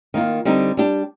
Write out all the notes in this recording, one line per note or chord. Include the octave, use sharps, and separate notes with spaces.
D#3 A#3 F4
D3 G3 C4 D#4
G3 D4 G4